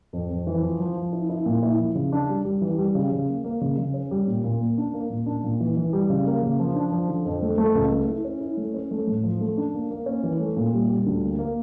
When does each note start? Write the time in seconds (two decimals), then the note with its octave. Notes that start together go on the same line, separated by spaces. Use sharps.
0.13 F2
0.30 F2
0.47 E3
0.63 F3
0.80 F3
0.97 F3
1.13 E4
1.29 E4
1.46 A#2
1.63 E4
1.79 F3
1.95 C#3
2.12 D4
2.29 G3
2.45 G3
2.62 E3
2.79 G3
2.95 C#3
3.12 C#3
3.28 A#3
3.44 A#3
3.61 C#3
3.78 C#3
3.94 C#4
4.11 G3
4.28 A#2
4.44 A#2
4.61 A#3
4.78 D4
4.93 A#3
5.10 A#2
5.26 D4
5.44 A#2
5.60 E3
5.77 E3
5.93 G3
6.10 C#3
6.27 A#3
6.43 C#3
6.60 F3
6.75 D4
6.92 F3
7.08 D3
7.25 F2
7.42 A3
7.58 A3
7.75 C#2
7.91 A3
8.08 E4
8.25 C#4
8.41 E4
8.57 A3
8.74 C#4
8.91 A3
9.07 A2
9.23 F3
9.41 A3
9.57 D4
9.74 A#3
9.90 A#3
10.06 C#4
10.23 E3
10.40 A3
10.57 A#2
10.73 G3
10.89 G3
11.06 D2
11.22 A#3
11.39 A#3